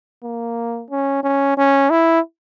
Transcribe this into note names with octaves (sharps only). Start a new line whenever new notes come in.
A#3
C#4
C#4
C#4
E4